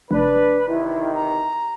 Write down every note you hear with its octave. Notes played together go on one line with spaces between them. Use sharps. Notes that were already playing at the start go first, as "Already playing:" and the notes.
F1 D4 B4
E2 C3 D#3 E4
A#5